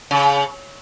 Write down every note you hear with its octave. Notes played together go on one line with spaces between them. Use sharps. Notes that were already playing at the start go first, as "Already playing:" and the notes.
C#3